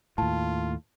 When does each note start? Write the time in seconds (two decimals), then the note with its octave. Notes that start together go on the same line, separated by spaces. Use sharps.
0.18 D#2 A2 F4 A5